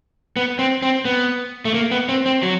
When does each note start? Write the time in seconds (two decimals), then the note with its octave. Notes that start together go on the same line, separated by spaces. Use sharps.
0.36 B3
0.59 C4
0.82 C4
1.05 B3
1.65 A3
1.74 A#3
1.91 B3
2.09 C4
2.26 C4
2.43 F#3